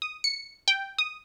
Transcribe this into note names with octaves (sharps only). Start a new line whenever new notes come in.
D#6
C#7
G5
D#6